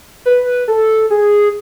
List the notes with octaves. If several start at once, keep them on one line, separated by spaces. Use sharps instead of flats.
B4
A4
G#4